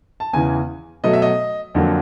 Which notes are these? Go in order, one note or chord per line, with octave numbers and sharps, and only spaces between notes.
A5
E2 C#3 E3 G#5
B2 F#3 A3 D#5
E5
D#5
F2 D3 F#3 A#3